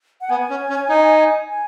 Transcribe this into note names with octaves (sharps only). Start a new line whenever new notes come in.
F#5
B3 G#5
C#4
C#4
D#4
G#5